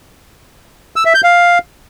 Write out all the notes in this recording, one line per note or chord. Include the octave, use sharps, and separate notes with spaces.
E6
E5
G6
F5